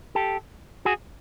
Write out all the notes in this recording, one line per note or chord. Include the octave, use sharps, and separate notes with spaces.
G4 A4
F#4 G#4